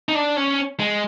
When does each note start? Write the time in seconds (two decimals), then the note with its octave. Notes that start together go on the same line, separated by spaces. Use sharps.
0.09 D#4
0.15 D4
0.37 C#4
0.80 G#3